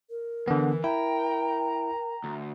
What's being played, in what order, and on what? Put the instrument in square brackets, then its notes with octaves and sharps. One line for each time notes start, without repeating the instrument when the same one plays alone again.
[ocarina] A#4
[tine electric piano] D3 B3 [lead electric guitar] E3
[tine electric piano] E4 [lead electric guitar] G5 [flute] A#5
[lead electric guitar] D2